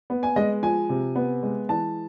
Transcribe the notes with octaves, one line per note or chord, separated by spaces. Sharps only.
B3
G#5
G#3 D#5
F3 G#5
C3
B3
G#3
E3 A5